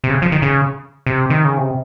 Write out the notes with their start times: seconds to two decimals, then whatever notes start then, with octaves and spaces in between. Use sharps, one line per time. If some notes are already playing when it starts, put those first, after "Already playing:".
0.04 C3
0.10 C#3
0.22 F3
0.32 D#3
0.42 C#3
1.06 C3
1.30 D#3
1.45 C#3
1.57 C3